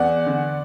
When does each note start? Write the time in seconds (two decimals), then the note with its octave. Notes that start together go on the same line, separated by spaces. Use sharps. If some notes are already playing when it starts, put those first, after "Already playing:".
Already playing: E2 D5 F#5
0.26 D3